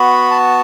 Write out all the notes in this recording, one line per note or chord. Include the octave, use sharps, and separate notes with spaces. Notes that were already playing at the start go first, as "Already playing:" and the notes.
Already playing: B3 F#4 B5
A5